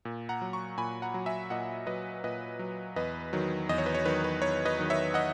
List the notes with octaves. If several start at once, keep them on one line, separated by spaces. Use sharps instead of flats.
A#2
F#5 A#5
F#3
A#5 C#6
A#2 G#5 B5
F#5 A#5
F#3
E5 G#5
A#2 D#5 F#5
F#3 B4 D#5
A#2 B4 D#5
F#3
E2 B4 D#5
D#3 F#3
E2 D#5
C#5
B4
C#5
D#3 F#3 B4
B4
E2 C#5
B4 D#5
D#3 F#3
C#5 E5
D#5 F#5